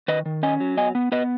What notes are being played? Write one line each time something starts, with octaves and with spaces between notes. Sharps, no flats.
D#3 B4 D#5
D#3
C#4 D#5 G#5
F#3
B3 D#5 G#5
B3
B3 B4 D#5